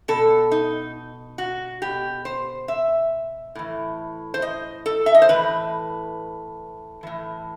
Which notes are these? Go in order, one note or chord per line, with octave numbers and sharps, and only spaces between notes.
B2 A4
D#4
F#4
B2 G4
C5
E5
A2 E3
C5
D#5
A4
E5
D#5
C5
A2 E3 B4
A2 E3